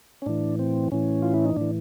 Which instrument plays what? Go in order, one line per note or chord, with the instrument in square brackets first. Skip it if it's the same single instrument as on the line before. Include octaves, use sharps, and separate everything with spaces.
[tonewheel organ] C#4
A2 E3 D4
C4
A2 E3 C#4
F4
E4
D#4
A2 E3 D4